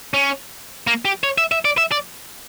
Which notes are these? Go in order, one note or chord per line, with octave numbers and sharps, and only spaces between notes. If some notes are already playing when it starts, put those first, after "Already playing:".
C#4
A#3
G4
C#5
E5
E5
D5
E5
D5